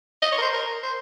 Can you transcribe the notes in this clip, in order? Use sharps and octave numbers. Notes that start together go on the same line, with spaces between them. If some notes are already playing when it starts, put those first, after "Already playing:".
D#5
C#5
A#4
C5
A#4
C5